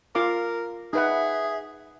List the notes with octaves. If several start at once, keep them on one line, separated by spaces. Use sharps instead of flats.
F4 A#4 F5 D6
D#4 G#4 B4 E5 F#5